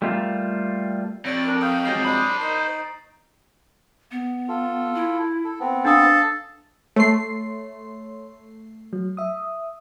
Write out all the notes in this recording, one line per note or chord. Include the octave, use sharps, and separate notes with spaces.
G3 A3 A#3 F4
F2 C#5 D5 A#6 D7 F#7
D4 A#4
F5 G5 C#6 D#6
F2 F#3 G#3 G4 D#5 A6 C7
D4 C5 B5 D#6 D7
D#4 A#4 C7
B3
F4 A4
E4
A4
B3 C4
D4 A4 F5 D#6
A3 C#5 C6 C7
F#3
E5 D#6